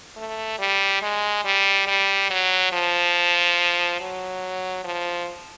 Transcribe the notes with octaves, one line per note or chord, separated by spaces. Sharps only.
A3
G3
G#3
G3
G3
F#3
F3
F#3
F3